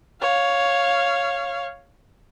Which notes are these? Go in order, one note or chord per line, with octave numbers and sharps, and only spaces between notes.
C#5 F5